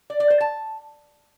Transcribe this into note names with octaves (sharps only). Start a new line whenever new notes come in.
D5
D5
C5
A5